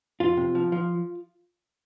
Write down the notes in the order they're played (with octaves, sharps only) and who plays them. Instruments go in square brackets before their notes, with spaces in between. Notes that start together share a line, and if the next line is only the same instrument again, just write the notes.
[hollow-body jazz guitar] F2 F4
C3
F3
F3